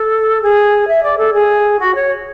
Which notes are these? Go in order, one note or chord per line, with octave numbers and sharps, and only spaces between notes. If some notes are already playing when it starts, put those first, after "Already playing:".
Already playing: A4
G#4
E5
D5
A4
G#4
F#4
C#5